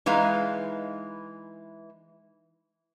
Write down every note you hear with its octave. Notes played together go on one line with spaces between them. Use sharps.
E3 G#3 D#4 B4 F5